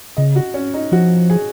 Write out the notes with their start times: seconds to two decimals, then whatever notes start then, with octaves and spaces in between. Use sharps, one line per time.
0.17 C#3 D#5
0.36 F#4
0.54 C#4
0.74 D#4
0.92 F3 F#4
1.30 G#4